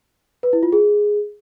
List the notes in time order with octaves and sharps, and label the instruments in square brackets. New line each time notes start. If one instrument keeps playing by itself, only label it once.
[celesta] B4
E4
F4
G#4